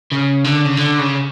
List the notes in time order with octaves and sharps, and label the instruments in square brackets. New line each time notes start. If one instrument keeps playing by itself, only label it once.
[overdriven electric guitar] C#3
D3
C#3
D3
C#3